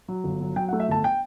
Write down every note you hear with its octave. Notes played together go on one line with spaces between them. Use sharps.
F#3
G1
F#3
F#3 G5
F#5
A3
E5
G1 A5
G5